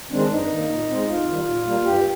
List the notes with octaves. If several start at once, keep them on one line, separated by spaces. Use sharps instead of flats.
D#3 G#3 C4 D4
G2 D#4
D#3 A#3
A#2
G#3 C4
F2 F4
D#3 G3
A#2
G3 A#3
G2 G4